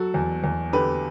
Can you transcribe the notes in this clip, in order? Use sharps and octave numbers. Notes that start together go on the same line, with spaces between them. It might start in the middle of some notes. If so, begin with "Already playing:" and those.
Already playing: F#3 F#4 A4
E2
E2
D3 G4 B4